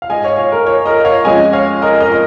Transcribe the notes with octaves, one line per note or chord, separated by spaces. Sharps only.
F5
G#2 G#3 D#5 G#5
C#5 F5
C#5 F5
A#4
C#5
A#4 D#5
C#5 F5
F2 C#3 G#3 D#5 G#5
C#5 F5
A#4 D#5
A#4 D#5
D#5